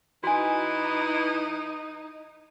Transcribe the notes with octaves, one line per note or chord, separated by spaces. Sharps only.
E3 D#4 F#4 G#5